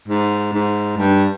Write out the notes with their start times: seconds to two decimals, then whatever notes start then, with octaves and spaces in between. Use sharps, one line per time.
0.08 G#2
0.53 G#2
0.98 G2